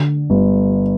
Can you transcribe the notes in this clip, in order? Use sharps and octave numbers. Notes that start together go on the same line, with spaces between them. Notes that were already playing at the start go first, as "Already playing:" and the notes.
Already playing: D3
G1